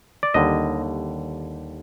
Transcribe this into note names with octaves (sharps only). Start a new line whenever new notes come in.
D5
D#2 D3 G3 D#5